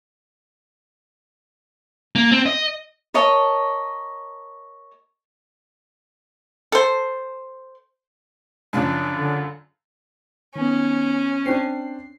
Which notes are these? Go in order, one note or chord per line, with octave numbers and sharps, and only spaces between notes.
A#3
C4
D#5
A#4 C#5 D#5 A5
A4 C5
F#2 C#3 F3 D4
D3
D#3 B3 C#4
C4 D4 C7